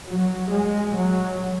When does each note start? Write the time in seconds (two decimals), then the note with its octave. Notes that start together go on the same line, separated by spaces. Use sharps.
0.10 F#3
0.52 G#3
0.96 F#3